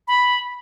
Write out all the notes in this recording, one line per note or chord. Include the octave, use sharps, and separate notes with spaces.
B5